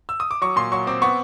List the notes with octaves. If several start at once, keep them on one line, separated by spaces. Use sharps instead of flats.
E6
D#6
D6
F#3 C#6
A#2 C6
F#3 C#6
C4 D6
B3 C#6